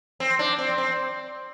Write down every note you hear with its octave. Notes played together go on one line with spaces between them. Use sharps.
C4
D4
C4
C4